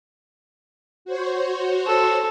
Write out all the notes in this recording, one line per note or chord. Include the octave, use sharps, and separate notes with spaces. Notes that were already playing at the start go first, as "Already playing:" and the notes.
F#4 C5 C#5
A4